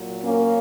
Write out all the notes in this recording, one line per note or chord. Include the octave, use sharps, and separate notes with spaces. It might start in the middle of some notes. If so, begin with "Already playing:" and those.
Already playing: A#2 F#3
A#3 C#4